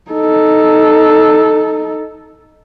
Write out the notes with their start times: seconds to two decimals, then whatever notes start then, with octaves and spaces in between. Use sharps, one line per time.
0.11 D#4 A4